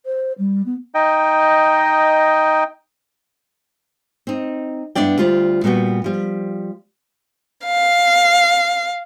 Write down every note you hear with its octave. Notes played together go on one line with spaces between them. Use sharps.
C5
G3
B3
D#4 D#5 G5
C4 D#4
G2 B3 D4 E4 D5 G5
D2 G3 F4 C5 D5
A#2 G3 B3 F#4 G5
F3 G3
F5